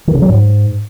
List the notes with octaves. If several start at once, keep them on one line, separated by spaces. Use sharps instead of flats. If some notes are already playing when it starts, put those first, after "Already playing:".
D#3
C#3
F#3
G#2